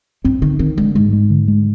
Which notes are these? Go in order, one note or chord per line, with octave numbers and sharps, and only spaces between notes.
G2 C4
D3 D#3
D#3 C4
D3 G#3
G#2 G#3
G#3
D3
G#3